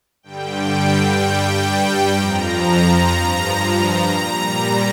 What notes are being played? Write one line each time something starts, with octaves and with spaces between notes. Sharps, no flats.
G2 D3 G3 G5
G2 G3 G5
F2 F3 A#5
G2 F3 A#5
A#5
A#2 G3 A#5